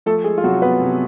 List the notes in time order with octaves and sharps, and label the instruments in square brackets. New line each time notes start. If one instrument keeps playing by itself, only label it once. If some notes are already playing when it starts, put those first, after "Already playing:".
[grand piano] F3 A3 A4
G#3 G#4
F4
C3 F#3 F#4
B3 B4
C3